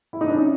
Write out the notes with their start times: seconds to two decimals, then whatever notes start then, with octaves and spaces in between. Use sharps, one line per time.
0.13 E4
0.21 D#4
0.28 D4
0.35 C#4